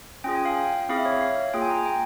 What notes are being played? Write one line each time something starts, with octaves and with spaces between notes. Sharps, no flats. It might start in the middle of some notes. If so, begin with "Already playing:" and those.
C#4 F4 G#4 G5
G#5
F5
G5
C4 E4 G#4 F5
E5
C#5
E5
F5
A#3 F4 G#4 G5
G#5
A#5
G#5
G5